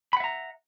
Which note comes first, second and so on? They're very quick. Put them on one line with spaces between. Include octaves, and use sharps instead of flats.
B5 F#5 E5 A#5